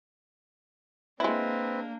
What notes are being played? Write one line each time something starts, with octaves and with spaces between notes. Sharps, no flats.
G#3 A#3 C4 D4 E4 B4